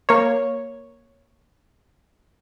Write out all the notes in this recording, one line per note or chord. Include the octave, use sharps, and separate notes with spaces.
A#3 C#5